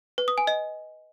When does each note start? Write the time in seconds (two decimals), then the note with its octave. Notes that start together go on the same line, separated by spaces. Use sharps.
0.18 B4
0.28 D#6
0.38 G#5
0.47 D#5